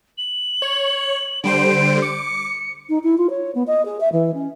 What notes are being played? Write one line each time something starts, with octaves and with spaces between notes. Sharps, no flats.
F#7
C#5
D3 G3 C5 D7
D6 C#7
D#4
E4
F4
C#5
B3
D#5
G#4
E5
E3
C#4